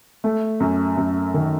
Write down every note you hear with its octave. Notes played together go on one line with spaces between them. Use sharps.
A3
F#2
F#2
D#3